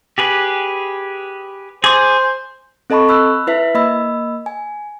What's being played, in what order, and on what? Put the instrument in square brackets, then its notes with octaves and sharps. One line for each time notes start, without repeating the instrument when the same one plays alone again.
[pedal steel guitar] G4 G#4 B4
[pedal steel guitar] G#4 D6 [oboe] C5
[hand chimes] C4 A4 D#5 A5 B5 C#6
B5 E6 F#6
E4 B4 E5 B6
A#3 D#5 B5 E6
G#5